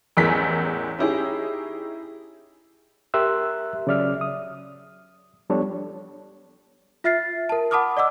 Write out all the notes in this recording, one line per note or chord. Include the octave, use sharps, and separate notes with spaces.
A1 E2 E3 G#3 A#4 B6
C#4 D#4 E4 G4 G#4
G4 A#4 E5 C6 E6 F#6
C#3 F#3 D5 E5 F6
D#6
F3 G3 B3 D4 A4 C#5
F4 E5 F6 A6 C7
A#4 A5
F#5 A5 B5 D6 D#6 F6
D5 D#5 F#5 D6 E6